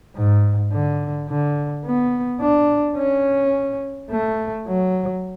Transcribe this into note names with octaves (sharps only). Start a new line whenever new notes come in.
G#2
D3
D3
B3
D4
C#4
A3
F#3